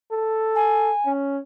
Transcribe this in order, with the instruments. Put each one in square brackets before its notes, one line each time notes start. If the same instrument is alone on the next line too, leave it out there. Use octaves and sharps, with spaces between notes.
[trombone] A4
[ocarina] G#5
[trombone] C#4